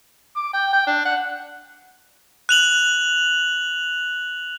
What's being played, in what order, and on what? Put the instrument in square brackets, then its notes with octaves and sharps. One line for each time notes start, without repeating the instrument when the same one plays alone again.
[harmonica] D6
G5
G5
D4
F#5
[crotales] F#6 F7 F#7